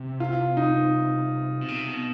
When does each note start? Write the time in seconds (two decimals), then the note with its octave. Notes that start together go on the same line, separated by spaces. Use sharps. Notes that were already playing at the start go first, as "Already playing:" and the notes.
Already playing: C3
0.20 F4
0.57 D#4
1.61 B2
1.68 C3
1.88 B2